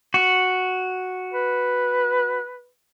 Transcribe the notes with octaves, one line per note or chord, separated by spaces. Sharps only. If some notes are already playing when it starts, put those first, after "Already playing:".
F#4
B4